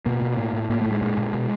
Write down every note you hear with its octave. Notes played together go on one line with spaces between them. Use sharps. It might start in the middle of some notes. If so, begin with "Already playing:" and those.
B2 A#3
B2
A2
A2
A2 A#3
A2 A3
G#3
A#2 G#3
A#2
B2